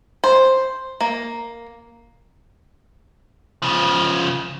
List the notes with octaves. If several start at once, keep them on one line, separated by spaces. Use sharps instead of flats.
C5
A#3
C#3 F3